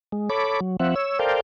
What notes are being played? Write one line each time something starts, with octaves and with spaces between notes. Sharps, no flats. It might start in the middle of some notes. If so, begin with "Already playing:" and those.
G#3
A4 C#5 B5 D6
F#3
F3 C4 E5 F#5
C#5 E6
A4 A#4 C5 D5 F5 G5